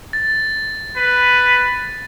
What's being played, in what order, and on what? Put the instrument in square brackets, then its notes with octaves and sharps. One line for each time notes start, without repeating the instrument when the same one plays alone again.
[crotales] A6
[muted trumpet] B4